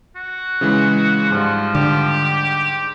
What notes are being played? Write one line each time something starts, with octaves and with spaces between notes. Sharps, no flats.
F#4
C#3 E3 G#3
G#2 F3 G3
D3 G4